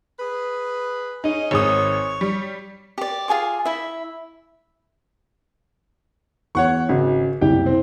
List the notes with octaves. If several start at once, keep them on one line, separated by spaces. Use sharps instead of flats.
G#4 B4
C#4 D#4 G#4 D#5
G#1 G#3 C#5 D#6
G3
G4 D5
F4 G#4 G#5 D6
E4 E5
E2 C#5 F#5 C#6
G#1 C#3 F#4
F#1 C2 E4 G4 G5
C4